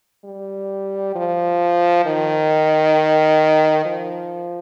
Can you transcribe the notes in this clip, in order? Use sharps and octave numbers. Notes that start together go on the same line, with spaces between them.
G3
F3
D#3
F3